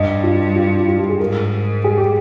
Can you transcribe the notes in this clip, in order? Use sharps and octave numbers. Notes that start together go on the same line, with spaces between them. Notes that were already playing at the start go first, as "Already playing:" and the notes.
Already playing: G2 D#5
F4
F4
F4
F4
G4
G#4
G#2 A#4
G#4
G4